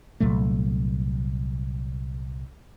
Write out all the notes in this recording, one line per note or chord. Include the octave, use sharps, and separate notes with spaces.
C2 A#2 F#3 A3